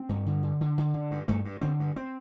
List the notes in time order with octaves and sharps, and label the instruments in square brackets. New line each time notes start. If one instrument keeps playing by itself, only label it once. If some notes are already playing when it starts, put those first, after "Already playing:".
Already playing: [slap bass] C4
G2
D3
D3
D3
D3
D3
G2
G2 A3
G2
D3 C4
G2
C4